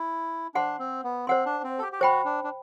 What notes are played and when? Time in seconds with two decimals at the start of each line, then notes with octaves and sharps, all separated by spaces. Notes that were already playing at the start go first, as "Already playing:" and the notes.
Already playing: E4
0.55 D4 C5 F#5 C6
0.79 C4
1.04 B3
1.27 C4 C5 F#5 C6
1.46 D4
1.64 C4
1.78 A4
1.82 G4
1.92 G4
2.00 F#4 C5 G5 B5
2.25 D4
2.44 D4